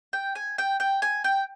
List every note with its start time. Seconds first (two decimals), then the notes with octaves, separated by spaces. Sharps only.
0.13 G5
0.35 G#5
0.58 G5
0.80 G5
1.02 G#5
1.24 G5